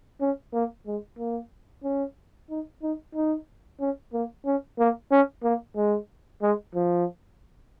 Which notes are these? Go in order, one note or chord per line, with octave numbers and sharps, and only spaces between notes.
C#4
A#3
G#3
A#3
C#4
D#4
D#4
D#4
C#4
A#3
C#4
A#3
C#4
A#3
G#3
G#3
F3